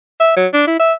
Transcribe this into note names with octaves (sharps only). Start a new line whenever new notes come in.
E5
F#3
D4
E4
E5